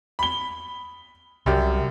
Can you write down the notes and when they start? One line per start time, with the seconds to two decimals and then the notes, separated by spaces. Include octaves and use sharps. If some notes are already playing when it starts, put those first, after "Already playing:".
0.19 B5 G7
1.46 C2 F#2 G4 D5